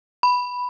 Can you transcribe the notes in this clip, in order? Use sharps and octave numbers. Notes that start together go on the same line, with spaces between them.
B5